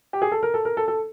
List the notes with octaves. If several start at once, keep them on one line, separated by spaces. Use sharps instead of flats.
G4
G#4
A4
A#4
A4
A#4
A4
A4